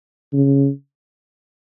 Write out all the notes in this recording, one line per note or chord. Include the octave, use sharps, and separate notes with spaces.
C#3